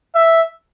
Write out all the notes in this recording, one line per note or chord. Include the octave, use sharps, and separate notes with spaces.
E5